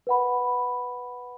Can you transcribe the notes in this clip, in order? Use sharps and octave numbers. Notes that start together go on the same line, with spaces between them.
B4 F#5 B5